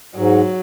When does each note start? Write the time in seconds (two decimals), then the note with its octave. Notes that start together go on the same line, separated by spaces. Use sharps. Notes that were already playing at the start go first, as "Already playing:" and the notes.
0.16 G#2 F#3